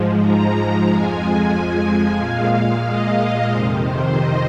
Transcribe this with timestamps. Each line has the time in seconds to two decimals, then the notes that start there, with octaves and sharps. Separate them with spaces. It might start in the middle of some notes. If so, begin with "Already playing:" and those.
Already playing: G#2 F3 G#3
0.18 A#5
0.83 F2 F3 G#3 G#5
2.16 A#2 G#3 F5
2.82 D#5
3.48 F2 C3 D#3 C5
3.81 C5
4.14 D#5